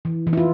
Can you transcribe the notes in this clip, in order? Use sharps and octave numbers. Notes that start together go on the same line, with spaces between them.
E3
E3
E4
F4